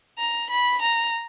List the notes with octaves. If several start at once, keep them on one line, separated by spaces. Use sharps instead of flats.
A#5
B5
A#5